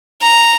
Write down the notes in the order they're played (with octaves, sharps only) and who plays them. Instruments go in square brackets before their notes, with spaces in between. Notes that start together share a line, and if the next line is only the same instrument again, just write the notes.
[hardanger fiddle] A#5